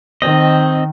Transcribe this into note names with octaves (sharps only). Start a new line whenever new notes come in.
D#3 C4 D#5